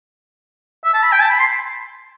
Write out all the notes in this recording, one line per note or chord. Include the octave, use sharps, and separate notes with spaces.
E5
A5
B5
G5
A5
B5
C6